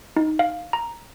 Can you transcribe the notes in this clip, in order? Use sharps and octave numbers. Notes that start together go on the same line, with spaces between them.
D#4
F5
A#5